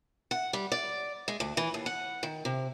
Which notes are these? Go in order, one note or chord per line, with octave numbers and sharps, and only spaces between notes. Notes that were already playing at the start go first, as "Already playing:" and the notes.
F#5
G3
D5
G#3
D2
E3
D#2
F#5
D#3
C3